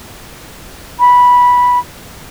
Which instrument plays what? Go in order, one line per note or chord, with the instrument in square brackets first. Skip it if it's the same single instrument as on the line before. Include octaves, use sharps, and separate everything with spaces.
[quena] B5